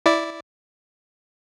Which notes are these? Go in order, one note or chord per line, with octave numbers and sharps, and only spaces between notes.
E4 D5